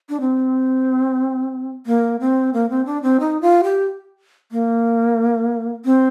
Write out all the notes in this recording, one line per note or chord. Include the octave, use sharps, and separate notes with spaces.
D4
C4
A#3
C4
A#3
C4
D4
C4
D#4
F4
G4
A#3
C4